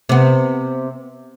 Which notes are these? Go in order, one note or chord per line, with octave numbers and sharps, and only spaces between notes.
C3 B3